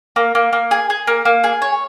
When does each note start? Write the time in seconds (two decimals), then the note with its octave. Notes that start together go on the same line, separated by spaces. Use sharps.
0.16 A#3
0.35 A#3
0.53 A#3
0.71 G#4
0.90 G#4
1.07 A#3
1.25 A#3
1.44 G#4
1.62 C#5